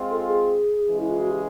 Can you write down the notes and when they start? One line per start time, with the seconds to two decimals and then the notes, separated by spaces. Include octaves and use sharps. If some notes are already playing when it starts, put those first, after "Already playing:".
Already playing: G#3 C4 F4
0.11 A4
0.29 G#4
0.85 C#3 E3 G#3
1.00 E4
1.10 F4
1.20 F#4
1.31 G4